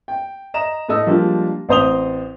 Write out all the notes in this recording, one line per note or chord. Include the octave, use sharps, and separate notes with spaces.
G5
D#5 A#5 E7
A2 A3 D#5 E6
F3 G3 G#3 A#3 D4
A1 C4 C5 D#6 F7 G7